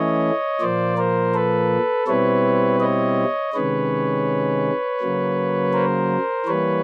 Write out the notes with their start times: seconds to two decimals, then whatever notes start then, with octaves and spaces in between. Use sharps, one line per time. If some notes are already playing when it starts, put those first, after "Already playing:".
Already playing: E3 A3 C#4 E4 C#5 D#5
0.61 A#2 F3 A#3 C5 D5
0.97 A#4 C5
1.34 A4 B4
2.07 B2 G3 C4 E4 B4 C#5
2.80 C#5 D#5
3.53 C3 D#3 G#3 C#4 B4 C#5
5.00 C#3 F#3 A#3
5.73 A#4 C5
6.46 E3 G3 A#3 B4 C#5